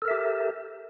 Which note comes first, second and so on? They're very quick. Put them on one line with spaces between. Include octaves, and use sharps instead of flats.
A4 A#4 E5 G4